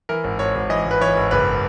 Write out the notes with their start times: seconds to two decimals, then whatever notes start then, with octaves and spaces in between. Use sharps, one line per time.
0.09 E3 A#4
0.24 G#1
0.39 G#1 C#5
0.55 G#1
0.70 E3 D#5
0.86 G#1
0.91 B4
1.01 E3 C#5
1.17 G#1
1.31 F#1 B4